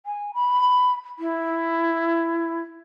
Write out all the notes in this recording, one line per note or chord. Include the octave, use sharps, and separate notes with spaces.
G#5
B5
E4